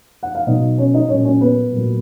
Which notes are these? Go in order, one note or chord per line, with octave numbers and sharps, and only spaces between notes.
F#5
F5
B2 F#3 D#4 D#5
C#4 C#5
D#4 D#5
A#2 F#3 C#4 C#5
C#4 C#5
B3 B4
A#2 F#3